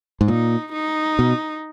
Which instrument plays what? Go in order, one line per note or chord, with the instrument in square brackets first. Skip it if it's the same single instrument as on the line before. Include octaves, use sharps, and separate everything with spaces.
[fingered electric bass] G#2
[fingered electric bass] A#2 [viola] D#4
[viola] D#4
[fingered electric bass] B2